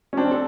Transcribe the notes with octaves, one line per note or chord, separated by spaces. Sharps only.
C#4
C4 D4
A4